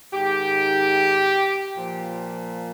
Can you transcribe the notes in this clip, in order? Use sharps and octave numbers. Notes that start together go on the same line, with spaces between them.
G#2 D#3 G4
A#2 F3